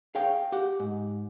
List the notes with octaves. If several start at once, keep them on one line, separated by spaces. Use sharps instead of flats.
G#4 C#5 F5 G5
G4 F#5
G#2